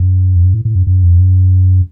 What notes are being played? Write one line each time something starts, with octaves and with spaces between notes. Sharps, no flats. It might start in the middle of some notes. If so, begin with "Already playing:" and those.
Already playing: F#2
F2
F#2
A2
A2
F#2
F#2
F2
F#2